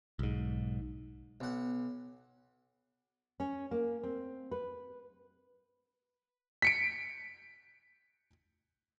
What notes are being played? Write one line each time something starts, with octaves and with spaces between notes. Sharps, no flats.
B1 G#2
B1 F#5
C#4
A#3
C4
B4
B6 C#7 D7